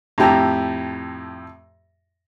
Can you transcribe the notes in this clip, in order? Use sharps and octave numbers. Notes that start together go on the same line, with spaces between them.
F2 A2 G4 A5 A#5